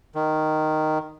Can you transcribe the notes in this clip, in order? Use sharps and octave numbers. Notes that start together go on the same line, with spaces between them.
D#3